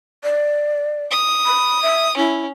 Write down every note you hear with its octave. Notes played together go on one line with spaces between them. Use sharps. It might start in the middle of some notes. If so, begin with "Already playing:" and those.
D5
D#6
B5
E5
C#4 E4